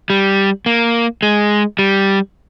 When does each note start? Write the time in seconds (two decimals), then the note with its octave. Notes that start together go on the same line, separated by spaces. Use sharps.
0.10 G3
0.66 A#3
1.23 G#3
1.79 G3